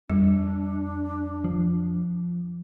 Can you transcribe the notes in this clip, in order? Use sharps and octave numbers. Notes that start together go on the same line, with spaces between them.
F2 G3 D4
F3